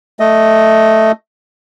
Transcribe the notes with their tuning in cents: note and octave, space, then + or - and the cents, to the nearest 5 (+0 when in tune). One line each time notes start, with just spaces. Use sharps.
A3 +0 D#5 +0